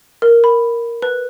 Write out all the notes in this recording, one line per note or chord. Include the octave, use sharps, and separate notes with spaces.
A#4
B5
B4